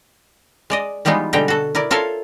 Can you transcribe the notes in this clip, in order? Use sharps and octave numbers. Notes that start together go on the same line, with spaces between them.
G#3 D5 D#5
E3 G3 G#3 B3 D#4 F4
B2 D3 G3 G#3 G5 A#5
F#4 A4
E4 A#4 D5
F4 A4 A#4 C#5 E5 F5